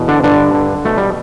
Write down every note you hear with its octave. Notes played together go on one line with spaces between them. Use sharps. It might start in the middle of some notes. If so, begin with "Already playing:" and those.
Already playing: E2 B2
D3 D4
G2 D3 D4
D3
B2 A3
G3